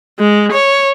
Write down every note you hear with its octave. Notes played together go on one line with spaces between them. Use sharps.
G#3
C#5